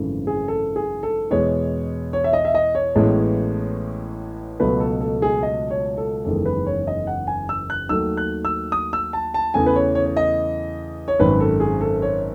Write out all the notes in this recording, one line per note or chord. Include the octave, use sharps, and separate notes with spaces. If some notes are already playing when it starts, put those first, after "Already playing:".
Already playing: G#1 F#2 C#3 E3 A3
G#4
A4
G#4
A4
E2 B2 G#3 B3 C#5
C#5
E5
D#5
E5
D#5
C#5
A1 A2 G#3 B3
C#2 B2 F#3 A3 B4
A4
A4
G#4
D#5
C#5
A4
F#1 E2 D#3 G#3 A4
B4
C#5
D#5
F#5
G#5
E6
F#6
D#2 D#3 F#3 A3 E6
F#6
E6
D#6
E6
A5
A5
E2 C#3 E3 A3 G#5
B4
C#5
C#5
C#5
D#5
C#5
G#1 F#2 D#3 B4
A4
G#4
A4
C#5